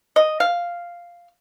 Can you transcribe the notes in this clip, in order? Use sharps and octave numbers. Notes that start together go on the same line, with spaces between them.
D#5
F5